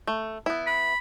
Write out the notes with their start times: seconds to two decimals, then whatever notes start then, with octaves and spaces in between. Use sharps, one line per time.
0.07 A3
0.46 B3 E4
0.67 B5